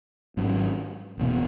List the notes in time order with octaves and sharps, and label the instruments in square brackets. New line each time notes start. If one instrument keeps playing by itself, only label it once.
[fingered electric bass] G#1 G#2 F#3 C#4
F#1 E2 B2 B3